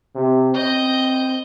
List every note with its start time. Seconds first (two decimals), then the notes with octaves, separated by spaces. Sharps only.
0.15 C3
0.54 C4 D#5 G6